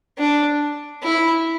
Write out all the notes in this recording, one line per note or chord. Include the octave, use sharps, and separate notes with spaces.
D4
E4